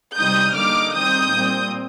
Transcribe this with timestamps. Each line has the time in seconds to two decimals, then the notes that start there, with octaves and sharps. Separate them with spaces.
0.17 C3 G3 C4 D#4 D#6 G6
0.55 D3 G3 A#3 D#4 D6 F6
0.93 D#3 G3 C4 D#4 D#6 G6
1.32 A#2 G3 C4